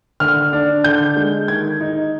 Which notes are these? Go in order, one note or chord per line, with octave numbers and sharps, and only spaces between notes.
D3 F6
D4
D3 G6
G#3
D#3 G#6
D#4